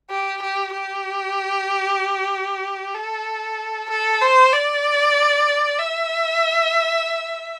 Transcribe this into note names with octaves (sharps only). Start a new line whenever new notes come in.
G4
G4
G4
A4
A4
C5
D5
E5